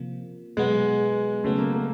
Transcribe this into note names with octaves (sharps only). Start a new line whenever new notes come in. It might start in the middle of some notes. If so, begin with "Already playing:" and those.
Already playing: C3 F3 A#3
B2 F#3 G#3 B3
C#3 F#3 A3 B3
A#3
A#3